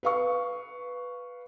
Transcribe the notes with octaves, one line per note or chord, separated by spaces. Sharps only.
B4 F5 C#6